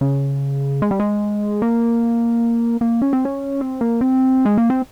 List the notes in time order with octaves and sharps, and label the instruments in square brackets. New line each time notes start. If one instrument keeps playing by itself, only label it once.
[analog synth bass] C#3
G#3
G3
G#3
A#3
A#3
C#4
C4
C#4
C4
A#3
C4
G#3
A#3
C4